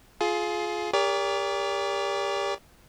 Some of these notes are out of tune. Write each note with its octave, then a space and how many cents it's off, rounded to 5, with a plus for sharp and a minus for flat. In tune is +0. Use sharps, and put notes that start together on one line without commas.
F4 +0 G#4 +25
G4 +35 A#4 +0 D5 -45